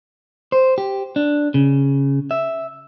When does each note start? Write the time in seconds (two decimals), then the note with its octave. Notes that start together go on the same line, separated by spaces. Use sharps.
0.52 C5
0.78 G4
1.16 D4
1.54 C#3
2.31 E5